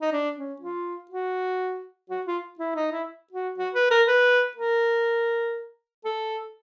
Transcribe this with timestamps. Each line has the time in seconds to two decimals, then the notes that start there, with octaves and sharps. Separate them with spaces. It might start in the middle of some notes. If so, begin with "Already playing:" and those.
0.01 D#4
0.12 D4
0.37 C#4
0.61 F4
1.11 F#4
2.10 F#4
2.26 F4
2.59 E4
2.75 D#4
2.92 E4
3.32 F#4
3.58 F#4
3.74 B4
3.90 A#4
4.07 B4
4.57 A#4
6.05 A4